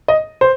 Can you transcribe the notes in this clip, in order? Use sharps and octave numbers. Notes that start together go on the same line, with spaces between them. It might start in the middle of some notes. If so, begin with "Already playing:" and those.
D#5
C5